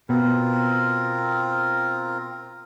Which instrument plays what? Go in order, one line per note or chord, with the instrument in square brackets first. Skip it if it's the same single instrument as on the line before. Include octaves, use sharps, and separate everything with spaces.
[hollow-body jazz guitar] B2 B3 [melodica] C4 F4 A#4